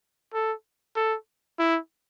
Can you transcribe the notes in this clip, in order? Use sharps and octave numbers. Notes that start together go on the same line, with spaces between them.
A4
A4
E4